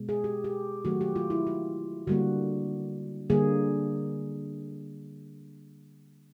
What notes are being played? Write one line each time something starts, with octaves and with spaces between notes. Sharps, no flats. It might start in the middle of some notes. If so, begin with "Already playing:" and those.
Already playing: B2 G#3
G#4
G4
G4
D#3 F#3 A3 F#4
G4
F4
E4
F4
D3 G3 A#3 F#4
D3 G3 A#3 G#4